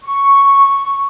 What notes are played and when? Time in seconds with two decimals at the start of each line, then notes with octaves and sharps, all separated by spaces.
0.03 C#6